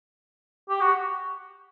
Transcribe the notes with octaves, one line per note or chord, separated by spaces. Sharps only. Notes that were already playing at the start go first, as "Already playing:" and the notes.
G4
F#4